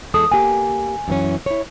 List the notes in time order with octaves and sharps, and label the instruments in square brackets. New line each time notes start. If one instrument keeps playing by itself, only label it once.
[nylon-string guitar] E2 G#3 A4 [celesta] D#6
[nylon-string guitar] A#3 G4 [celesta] G#5
[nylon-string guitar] F#2 E3 C#4
E4 C#5